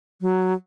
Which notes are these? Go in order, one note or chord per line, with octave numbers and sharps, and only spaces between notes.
F#3